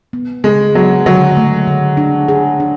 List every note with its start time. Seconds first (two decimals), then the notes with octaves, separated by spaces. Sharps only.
0.13 B3
0.44 C#3 G#3
0.75 F#3 B3
1.06 D3 F#3
1.37 A3
1.68 D3
1.97 D4
2.28 G#4
2.60 D4